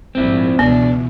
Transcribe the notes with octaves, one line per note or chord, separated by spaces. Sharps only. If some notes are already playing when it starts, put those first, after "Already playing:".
A#1 G#2 C4 E4
C#2 B2 E3 B3 D4